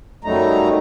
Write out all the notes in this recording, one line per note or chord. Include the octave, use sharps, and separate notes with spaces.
F#2 F#3 G3 A3 D#4 A#5